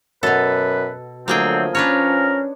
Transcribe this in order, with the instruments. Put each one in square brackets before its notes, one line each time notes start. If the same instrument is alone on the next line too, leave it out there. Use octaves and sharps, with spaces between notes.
[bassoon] F#2 [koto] B2 A4 [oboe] B4
[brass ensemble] D3 F#3 A3 [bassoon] F3 [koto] A#3 G#4 G5 [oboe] C4
[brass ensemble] C#4 [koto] D4 B4 C#5 [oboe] A#4